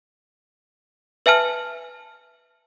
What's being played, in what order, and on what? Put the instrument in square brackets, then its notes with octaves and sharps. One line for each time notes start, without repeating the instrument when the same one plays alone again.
[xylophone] B4 E5 G#5 A5 F6